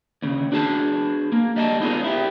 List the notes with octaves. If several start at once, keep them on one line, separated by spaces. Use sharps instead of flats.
D#2 C#3
D4 F#4 G#4 A5
A#3
G3 D#5 A5
B3 D#4 F4 G#4 A#4
E4 G4